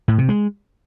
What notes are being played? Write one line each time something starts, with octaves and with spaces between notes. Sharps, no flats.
A2
C3
G#3